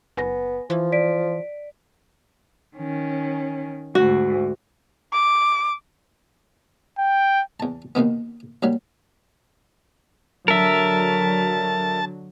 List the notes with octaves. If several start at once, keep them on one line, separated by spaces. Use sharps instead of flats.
F#1 B3 G#5 A#6
E3 F3
D5 B6 D7
D#3 C#4
D2 G#2 F#4
D6
G5
E2 A5
D#2 B2 D#3 B3
D#2 F#3 G3
D3 F#3 A#4 E5 A5